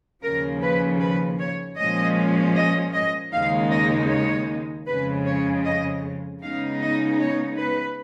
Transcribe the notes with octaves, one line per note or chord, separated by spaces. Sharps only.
D#2 C#3 F3 A#4
B4
B4
C#5
A#2 F3 G#3 C#4 D#5
D#5
D#5
D#2 C#3 G#3 D#4 F5
D#5
C#5
F2 C#3 G#3 B4
C#5
D#5
C#3 G#3 B3 D#4 F5
D#5
C#5
B4